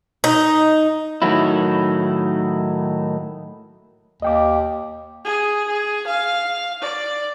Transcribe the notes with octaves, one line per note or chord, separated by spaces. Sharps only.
D#4
A2 D#3 F#3 E4
D#2 D#5 G5 D6
G#4
G#4
F5
D5